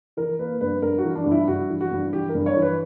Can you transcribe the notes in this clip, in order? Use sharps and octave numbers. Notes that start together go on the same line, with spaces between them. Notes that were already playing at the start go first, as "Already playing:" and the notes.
E3 A#4
A#3 B4
G2 B4
G2 A#4
F#4
E3
D4
G2
E4
G2 F#4
E3
F#4
G2
E3 G4
A#4
G2
C#5
E3
B4